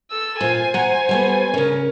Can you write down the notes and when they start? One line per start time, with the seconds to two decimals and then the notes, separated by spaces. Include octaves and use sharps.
0.11 A4 E6
0.41 A#2 F4 C5 G#5
0.74 F#5 A#5
1.09 G3 A3 B3
1.54 C#3 C#4 A#4